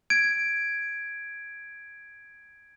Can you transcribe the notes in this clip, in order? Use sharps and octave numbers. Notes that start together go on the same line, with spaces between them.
G#6 D7